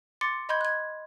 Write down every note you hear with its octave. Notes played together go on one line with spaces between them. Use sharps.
C6 D6 A6 C#7
D#5 B5 C6 G6 G#6
F#6 G#6